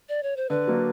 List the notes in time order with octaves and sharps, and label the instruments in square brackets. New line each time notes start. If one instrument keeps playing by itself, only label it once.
[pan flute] D5
C#5
C5
[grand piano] D3 [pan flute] B4
[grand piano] F#3 A#3 D4